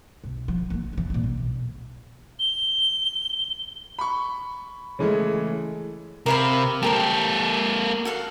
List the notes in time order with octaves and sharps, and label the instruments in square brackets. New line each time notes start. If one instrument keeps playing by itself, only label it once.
[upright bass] B1
F3
G#3 A#3
F2 E3
A#2 C4
B1
[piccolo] G7
[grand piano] B5 C#6
C#3 E3 G#3 A3
[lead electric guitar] C3 [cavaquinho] A#4 F5 B5
[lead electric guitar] A#3 A4 [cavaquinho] G4 A#4 C5
[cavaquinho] F#4 A4 F5